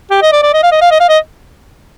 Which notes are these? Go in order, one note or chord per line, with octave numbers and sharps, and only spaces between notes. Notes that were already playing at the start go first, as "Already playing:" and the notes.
G4
D#5
D5
D5
D#5
F5
D#5
F5
D#5
F5
D#5